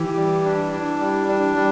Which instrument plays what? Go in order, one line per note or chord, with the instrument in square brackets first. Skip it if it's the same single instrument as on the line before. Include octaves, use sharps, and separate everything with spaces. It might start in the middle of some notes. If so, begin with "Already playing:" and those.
Already playing: [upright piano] E3 [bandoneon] G4
[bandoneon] G3
D4
D4
G3
D4
G3